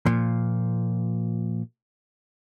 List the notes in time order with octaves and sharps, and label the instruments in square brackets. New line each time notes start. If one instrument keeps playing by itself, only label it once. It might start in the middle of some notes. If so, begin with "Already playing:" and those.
[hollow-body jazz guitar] A#2 F3